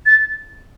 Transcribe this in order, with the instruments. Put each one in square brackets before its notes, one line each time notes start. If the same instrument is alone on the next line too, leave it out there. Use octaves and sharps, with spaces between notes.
[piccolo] A6